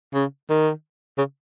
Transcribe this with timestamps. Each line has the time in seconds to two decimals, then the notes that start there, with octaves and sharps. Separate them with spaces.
0.14 C#3
0.50 D#3
1.18 C#3